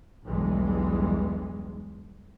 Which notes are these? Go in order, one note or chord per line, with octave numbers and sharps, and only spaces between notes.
B1 E2 G2 E3 G#3